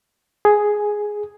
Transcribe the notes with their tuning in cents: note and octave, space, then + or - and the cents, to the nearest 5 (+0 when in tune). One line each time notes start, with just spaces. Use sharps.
G#4 +5